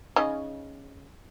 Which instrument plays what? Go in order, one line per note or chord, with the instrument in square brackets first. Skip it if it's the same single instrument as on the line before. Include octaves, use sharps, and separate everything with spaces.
[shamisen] C#3 D#4 D#5